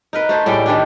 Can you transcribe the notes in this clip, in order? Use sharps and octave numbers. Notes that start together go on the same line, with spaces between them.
D#4 A#4 B4
A3 C5
A2 G3 G#4 G5
D#3 E3 G3 D4